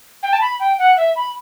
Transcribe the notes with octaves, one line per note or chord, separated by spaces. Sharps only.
G5
A5
B5
G5
F#5
E5
B5